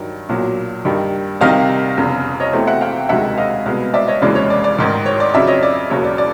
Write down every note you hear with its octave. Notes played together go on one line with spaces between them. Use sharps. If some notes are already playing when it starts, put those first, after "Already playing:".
Already playing: G2 D#3 F#3
B1 A#2 F#3
G2 D#3 G3
C2 C3 D#3 G3 D#5 F5
F1 E2 C#3
C#5 D#5
E2 C3 E3 A3 C4
E5 F#5
F5 G5
E1 D2 C3 D#3 G#3 E5 F#5
D#5 F5
C2 B2 G#3 B3
D5 E5
C#5 D#5
F1 D#2 C#3 E3 G#3 D5
C#5
D5
D5
A1 G#2 D#3
C#5
D5
F2 C#3 F#3 D5 E5
C#5 D#5
D5
E1 D#2 C#3 F#3 C#5
D5
D5